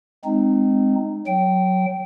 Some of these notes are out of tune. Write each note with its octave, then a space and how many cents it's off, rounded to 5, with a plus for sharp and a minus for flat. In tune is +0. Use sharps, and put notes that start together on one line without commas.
G#3 +0 C4 -10 D#4 -20
F#3 +0 G5 -20